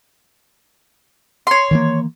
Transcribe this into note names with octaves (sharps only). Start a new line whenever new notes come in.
C#5 C6
D#3 E3 A#3